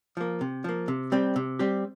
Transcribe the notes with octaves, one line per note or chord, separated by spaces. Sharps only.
F3 A#3
C3
F3 A#3
C3
G3 C4 G4
C3
G3 C4 G4